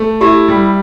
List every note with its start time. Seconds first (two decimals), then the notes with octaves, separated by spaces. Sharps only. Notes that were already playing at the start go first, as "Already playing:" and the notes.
Already playing: A3
0.21 E4 G4
0.48 G3